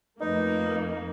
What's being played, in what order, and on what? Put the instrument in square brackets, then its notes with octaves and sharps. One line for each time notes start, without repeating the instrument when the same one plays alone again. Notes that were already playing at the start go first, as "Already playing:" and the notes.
[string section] F2 A#3 [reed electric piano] A3 B4 D#5 [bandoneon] D#4